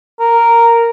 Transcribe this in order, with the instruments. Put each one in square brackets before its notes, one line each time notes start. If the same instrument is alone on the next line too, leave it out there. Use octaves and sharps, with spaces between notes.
[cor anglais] A#4